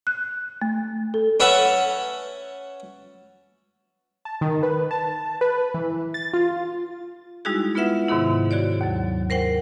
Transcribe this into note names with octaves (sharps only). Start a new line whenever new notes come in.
F#6
A3
A4
C#4 B4 C#5 E5 F#5 A5
A5
D#3
B4
A5
B4
E3
A6
F4
G3 G#3 D#4 E4 F#4 G#4
B3 E4 F4 B4 E5 F#5
G#2 C3 D#3 B3 E4
F#4 G#4 C#5 D5
D#2 F#3
A#4 C5 F#5 G5